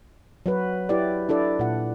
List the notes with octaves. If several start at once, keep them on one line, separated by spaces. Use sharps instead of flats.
F#3 F#4 B4
E4 G4 B4 D5
D4 E4 A4 D5
A#2 F#5